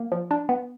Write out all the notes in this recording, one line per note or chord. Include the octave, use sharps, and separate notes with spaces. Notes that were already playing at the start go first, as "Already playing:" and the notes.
Already playing: A#3
F3
D4
B3